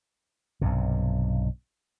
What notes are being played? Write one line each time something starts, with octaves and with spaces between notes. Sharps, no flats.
B1 G2 C3